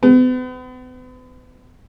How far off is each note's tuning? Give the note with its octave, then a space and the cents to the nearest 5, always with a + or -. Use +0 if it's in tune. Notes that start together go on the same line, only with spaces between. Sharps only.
B3 +40